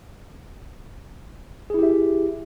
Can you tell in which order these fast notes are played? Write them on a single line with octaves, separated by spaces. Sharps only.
G#4 E4 G4 E5